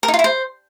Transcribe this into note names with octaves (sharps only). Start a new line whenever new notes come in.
A#4
D#4
F4
E4
C5